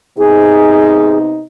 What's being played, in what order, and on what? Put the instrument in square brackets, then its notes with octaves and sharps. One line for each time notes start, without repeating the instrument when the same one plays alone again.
[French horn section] C3 B3 D#4 [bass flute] G#4